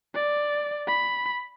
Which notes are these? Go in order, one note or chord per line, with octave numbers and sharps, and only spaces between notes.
D5
B5